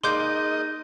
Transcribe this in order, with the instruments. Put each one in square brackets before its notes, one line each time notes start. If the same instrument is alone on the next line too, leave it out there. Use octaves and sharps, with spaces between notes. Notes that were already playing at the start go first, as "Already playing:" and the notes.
[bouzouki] G#3 A#3 D5 [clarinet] D#4 [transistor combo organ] D#5 [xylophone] C6 D6 G6